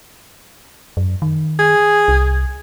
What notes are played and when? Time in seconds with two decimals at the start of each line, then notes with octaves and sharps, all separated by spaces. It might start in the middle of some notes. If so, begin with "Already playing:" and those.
0.97 F#2
1.22 D#3
1.59 G#4
2.08 C2